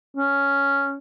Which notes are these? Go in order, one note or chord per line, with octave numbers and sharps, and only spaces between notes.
C#4